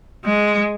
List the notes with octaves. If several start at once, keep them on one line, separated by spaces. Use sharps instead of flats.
G#3